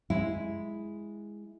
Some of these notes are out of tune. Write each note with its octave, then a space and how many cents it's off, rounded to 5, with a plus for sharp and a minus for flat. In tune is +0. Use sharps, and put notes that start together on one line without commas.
G#3 +0 E4 +0